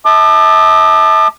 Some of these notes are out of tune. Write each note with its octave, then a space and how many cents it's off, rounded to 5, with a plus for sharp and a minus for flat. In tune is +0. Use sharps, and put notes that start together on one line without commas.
E5 -40 A5 +0 D6 +40